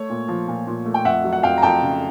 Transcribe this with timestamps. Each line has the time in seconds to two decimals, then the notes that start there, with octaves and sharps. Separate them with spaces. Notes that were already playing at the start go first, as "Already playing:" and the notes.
Already playing: A3 C#5
0.10 A#2
0.28 F3
0.48 A#2
0.67 A#2
0.86 A3
0.94 G5
1.05 F2 E5 F#5
1.24 F#3
1.33 F#5
1.43 F2 F5 G5
1.58 A#5
1.62 F2 G5 A5
1.82 C#3